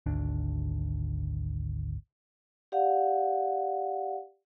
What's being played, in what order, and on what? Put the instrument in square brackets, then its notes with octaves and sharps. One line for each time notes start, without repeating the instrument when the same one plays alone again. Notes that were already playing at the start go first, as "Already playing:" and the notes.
[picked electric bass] G#1 D2 D4
[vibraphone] G4 D5 F5 F#5